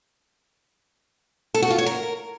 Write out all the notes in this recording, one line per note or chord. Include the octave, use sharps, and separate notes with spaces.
A4
F#4
F4
C#5
A#4